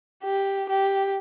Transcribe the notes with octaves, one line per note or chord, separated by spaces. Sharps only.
G4
G4